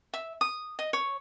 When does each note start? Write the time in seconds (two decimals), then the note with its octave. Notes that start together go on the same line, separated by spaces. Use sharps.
0.14 E5
0.41 D#6
0.79 D#5
0.93 C#5